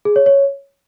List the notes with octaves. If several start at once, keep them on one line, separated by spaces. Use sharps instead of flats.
G#4
C#5
C#5